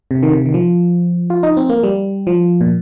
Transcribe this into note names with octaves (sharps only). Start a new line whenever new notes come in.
C3
D#3
C3
D#3
F3
F4
D#4
C4
A#3
G3
F3
A#2